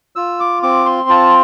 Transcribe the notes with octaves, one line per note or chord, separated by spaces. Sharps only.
F4 E6
D6
C4 D6
C6
F4 A5